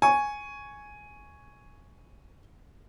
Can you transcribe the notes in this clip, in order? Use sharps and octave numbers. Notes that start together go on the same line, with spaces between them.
G#5 C#6